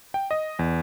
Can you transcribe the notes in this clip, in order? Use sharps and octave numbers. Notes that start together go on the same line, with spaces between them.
G5
D#5
E2